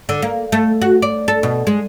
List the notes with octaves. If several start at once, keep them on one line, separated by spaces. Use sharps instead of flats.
D3
A#3
A3
F#4
D5
A4
B2
G#3